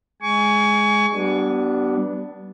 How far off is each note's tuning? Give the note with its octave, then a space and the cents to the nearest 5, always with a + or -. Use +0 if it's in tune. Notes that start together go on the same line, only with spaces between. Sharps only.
G#3 +10 G#5 +0 C#6 +30
G3 -40 B3 +0 D4 +0